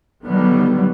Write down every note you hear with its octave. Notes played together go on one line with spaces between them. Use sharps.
D3 D#3 F#3 G3 B3